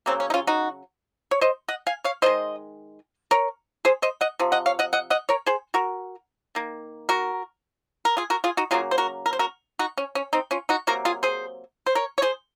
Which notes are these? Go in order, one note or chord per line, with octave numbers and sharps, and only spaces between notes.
C#3 F#3 A#3 C4
C#4
D#4
C#4 F4
D#4 F#4
C#5
C5 D#5
D#5 F#5
F5 G#5
C#5 F5
D#3 G#3 C5 D#5
A#4 C#5
G#4 C5
C5 D#5
D#5 F#5
C3 F3
D#5 F#5
C#5 F5
D#5 F#5
D#5 F#5
D#5 F#5
A#4 C#5
G#4 C5
F#4 A#4
D#3 A#3
F#4 A#4
A#4
F4 G#4
F#4 A#4
F4 G#4
D#4 F#4
C#3 F#3 A#3 F4 G#4
C5
F#4 A#4
A#4
C5
F#4 A#4
D#4 F#4
C#4
C#4
C4 D#4
C#4 F4
D#4 F#4
C3 F#3 A#3 F#4 A#4
F4 G#4
G#4 C5
C5
A#4 C#5
C#5
G#4 C5